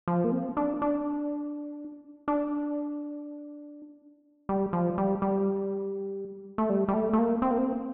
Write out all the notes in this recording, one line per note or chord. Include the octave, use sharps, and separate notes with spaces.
F3
A#3
C4
D4
D4
D4
G3
F3
G3
G3
A3
G3
G3
A3
A3
A#3
C4
A#3
C4